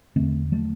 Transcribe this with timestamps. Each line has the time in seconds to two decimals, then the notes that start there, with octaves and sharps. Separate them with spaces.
0.16 E2 D3 A3 C4
0.52 F#3 A3